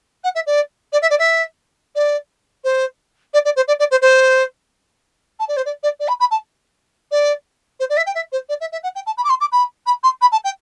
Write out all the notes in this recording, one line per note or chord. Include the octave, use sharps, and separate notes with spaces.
F#5
E5
D5
D5
E5
D5
E5
D5
C5
D5
D5
C5
D5
D5
C5
C5
A5
D5
C5
D5
D5
D5
B5
B5
A5
D5
C5
D5
E5
G5
E5
C5
D5
E5
E5
F#5
G5
A5
B5
D6
C6
D6
B5
B5
C6
B5
A5
G5